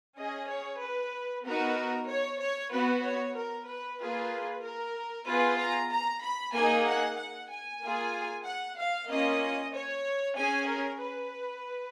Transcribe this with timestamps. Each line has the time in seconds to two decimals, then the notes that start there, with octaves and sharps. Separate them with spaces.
0.18 C#4 G#4 D#5
0.50 C#5
0.82 B4
1.45 B3 D#4 F#4 A#4
2.09 C#5
2.40 C#5
2.73 B3 F#4 B4
3.04 C#5
3.36 A#4
3.68 B4
4.00 A#3 F4 G#4 B4
4.63 A#4
5.27 B3 F4 G#4 B4
5.58 A#5
5.91 A#5
6.23 B5
6.54 A#3 D#4 G#4 G#5
6.86 F#5
7.18 F#5
7.50 G#5
7.82 A#3 F4 G#4
8.45 F#5
8.77 F5
9.09 A#3 C#4 F4 D#5
9.73 C#5
10.36 C#4 G#4 G#5
10.68 A#4
11.00 B4